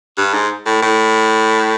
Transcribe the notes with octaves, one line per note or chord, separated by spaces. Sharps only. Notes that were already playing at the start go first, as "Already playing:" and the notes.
G2
G#2
A2
A2